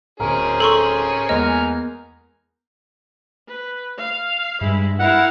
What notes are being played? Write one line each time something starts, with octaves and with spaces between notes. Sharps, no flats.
D1 C4 C#4 G#4 A#4
A4 C6 C#6
E2 G#3 A#3 D#5 G#5 A#5 F6
B4
F5
G2 G#3 E4
E4 A#4 F5 F#5